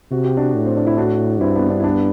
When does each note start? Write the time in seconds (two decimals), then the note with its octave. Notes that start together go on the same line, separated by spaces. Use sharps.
0.11 C3 F#4
0.24 G4
0.37 D4 F#4
0.55 A2
0.65 C4
0.77 D4
0.87 E4
0.98 D4 F#4
1.40 G2 C4 E4
1.56 B3 D4
1.70 B3 D4
1.80 E4
1.84 B3 D4